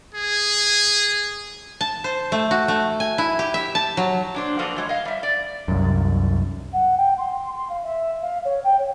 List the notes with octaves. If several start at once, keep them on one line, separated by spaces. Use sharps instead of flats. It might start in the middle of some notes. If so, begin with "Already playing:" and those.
G#4
A5
C5
A3
F#4
A3
G#5
E4
G4
E5
A5
F#3
A#2 D4 C5
F3 A#3 F#4 A4 B4 C5
E3 F#3 G#3 C5 C#5
D#5 F5
G3 E5
D5
C2 F#2
F#5
G5
C6
C6
F5
E5
F5
C#5
G5
C#5